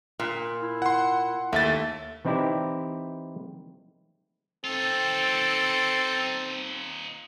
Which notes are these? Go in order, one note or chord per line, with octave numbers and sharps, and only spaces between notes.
A#2
E4
F#5 C6
D#2 A3 E5 A6
E3 C4 D#4 E4 G4 D5
C4 D#4 F4 A4